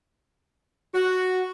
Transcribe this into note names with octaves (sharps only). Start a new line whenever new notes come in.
F#4